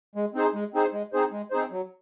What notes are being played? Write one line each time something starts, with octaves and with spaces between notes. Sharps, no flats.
G#3
C4 D#4 G#4 C5
G#3
C4 D#4 G#4 C5
G#3
C4 D#4 G#4 C5
G#3
C4 D#4 G#4 C5
F#3